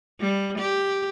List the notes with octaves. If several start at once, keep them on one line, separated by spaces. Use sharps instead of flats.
G3
G4